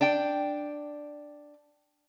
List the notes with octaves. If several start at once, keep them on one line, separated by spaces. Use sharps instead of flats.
D4 D5 G5